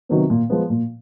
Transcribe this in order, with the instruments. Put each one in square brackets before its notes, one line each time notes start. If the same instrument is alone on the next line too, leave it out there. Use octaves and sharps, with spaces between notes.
[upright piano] C3 D#3 F#3 B3
A#2
F3 G#3 B3
A#2